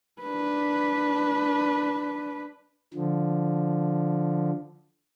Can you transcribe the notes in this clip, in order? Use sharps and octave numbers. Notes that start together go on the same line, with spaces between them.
D4 B4
D3 F3